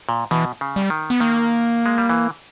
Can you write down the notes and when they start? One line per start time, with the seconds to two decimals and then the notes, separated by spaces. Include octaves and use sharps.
0.09 A#2
0.31 B2 E3
0.61 C#3
0.76 G3
0.90 D#3
1.10 B3
1.20 D#3 A#3
1.86 G#3
1.98 G3
2.10 E3